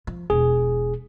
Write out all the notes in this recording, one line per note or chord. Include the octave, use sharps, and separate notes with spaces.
F3
E1 G#4